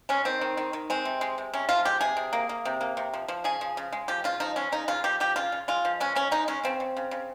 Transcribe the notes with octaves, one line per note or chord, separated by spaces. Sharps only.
G#3 C#4
D#3 C4
D#3
D#3
D#3
G#3 C4
C3
G#3
C3
C3 C#4
F3 F4
G#3 G4
C3 G#4
C3
A#3
A#3
C3
A#3
C3
F3
F3
C#3 G#4
F3
C#3
G#3
F3 G4
C#3 F4
F3 D#4
G#3 C#4
C#3 D#4
C#3 F4
F3 G4
F3 G4
C#3 F4
C#3
G#3 F4
F3
G#3 C#4
C#3 C#4
G#3 D#4
G#3 C#4
C#3 C4
C#3
C#3
C#3